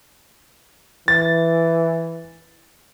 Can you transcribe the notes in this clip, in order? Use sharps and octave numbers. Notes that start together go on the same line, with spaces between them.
E3 A6